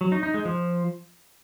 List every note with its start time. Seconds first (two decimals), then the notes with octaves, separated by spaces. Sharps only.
0.01 F#3
0.12 D#4
0.23 D#4
0.34 G#3
0.45 F3